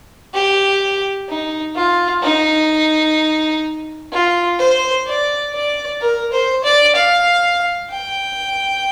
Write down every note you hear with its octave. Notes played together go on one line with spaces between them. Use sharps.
G4
D#4
F4
D#4
F4
C5
D5
D5
A#4
C5
D5
F5
G5